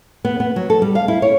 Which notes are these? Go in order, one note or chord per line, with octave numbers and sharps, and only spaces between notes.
B3
B3
F#3
A4
G3
F5
E4
C#5